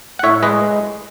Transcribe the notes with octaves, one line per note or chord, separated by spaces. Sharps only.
F#5
A2 C#5 E5
G#3 B4 D#5